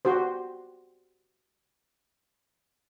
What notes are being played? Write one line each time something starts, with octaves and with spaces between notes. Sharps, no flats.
F#4 G4 C5